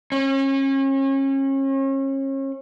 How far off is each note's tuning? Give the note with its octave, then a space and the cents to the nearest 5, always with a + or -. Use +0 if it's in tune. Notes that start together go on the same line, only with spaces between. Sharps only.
C#4 -35